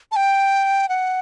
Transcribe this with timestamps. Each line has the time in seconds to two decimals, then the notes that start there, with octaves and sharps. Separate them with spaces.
0.12 A5
0.16 G5
0.89 F#5